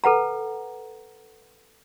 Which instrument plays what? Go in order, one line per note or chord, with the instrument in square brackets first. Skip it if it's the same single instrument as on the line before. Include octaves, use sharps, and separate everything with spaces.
[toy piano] A4 B4 F#5 A#5